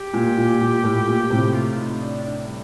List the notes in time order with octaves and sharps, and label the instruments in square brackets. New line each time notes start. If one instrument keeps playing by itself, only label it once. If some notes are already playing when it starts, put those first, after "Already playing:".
Already playing: [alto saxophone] G4
[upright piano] A#2
A#2
A#2
A2
A#2
A2 C3
[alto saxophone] F4
D#4
D4
D4
G3